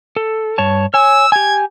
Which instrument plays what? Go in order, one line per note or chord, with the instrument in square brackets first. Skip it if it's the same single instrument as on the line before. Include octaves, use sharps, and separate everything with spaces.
[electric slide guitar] A4
G2 C#5 A5
[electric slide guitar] C#5 G#5 [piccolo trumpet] E6
[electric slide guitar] G4 G#5 [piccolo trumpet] G#6